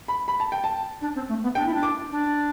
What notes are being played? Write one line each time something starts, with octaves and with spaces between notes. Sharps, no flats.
B5
B5
A5
G5
A5
D4
C4
A3
B3
D4 G5
E4
D4
D6
D4